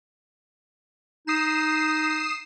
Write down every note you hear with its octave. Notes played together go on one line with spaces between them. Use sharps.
D#4 D#6 C7 E7